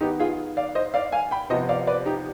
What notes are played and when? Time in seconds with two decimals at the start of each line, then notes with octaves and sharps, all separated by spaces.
0.01 D#3 B3 D#4 G4
0.20 F4 G#4
0.57 D5 F5
0.75 C5 D#5
0.94 D5 F5
1.12 F5 G#5
1.31 G5 B5
1.50 C3 F3 B3 C5 D#5
1.69 D5 F5
1.87 B4 D5
2.06 D#4 G4